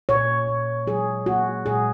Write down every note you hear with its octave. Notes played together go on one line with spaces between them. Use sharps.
A#2 C#5
A#2
F#3 G#4
A#3 F#4
A#2 G#4